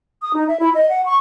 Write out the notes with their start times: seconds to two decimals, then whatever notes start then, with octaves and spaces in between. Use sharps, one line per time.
0.22 D#6
0.34 D#4
0.48 E5
0.60 E4
0.74 D#5
0.89 F#5
1.06 C#6